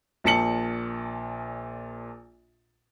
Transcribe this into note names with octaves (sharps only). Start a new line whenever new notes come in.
A#1 A#2 A5 C#7 F#7